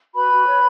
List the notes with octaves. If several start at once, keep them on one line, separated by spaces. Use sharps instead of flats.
F#4 B4 B5
F#4
C#5